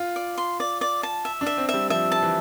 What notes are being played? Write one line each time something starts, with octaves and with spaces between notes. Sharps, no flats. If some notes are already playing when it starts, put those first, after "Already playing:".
Already playing: F4
D5
C6
D5
D5
A5
E5
D4
E5
C4
G3 E5
F3 E5
A5
E3